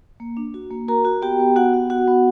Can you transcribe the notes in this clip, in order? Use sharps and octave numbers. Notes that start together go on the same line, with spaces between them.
A#3
D4
F#4
A#3
F#4 A#4 A#5
F#4
B3 G4 G5
B3
B3 F#4 F#5
F#4
F#4 F#5
B3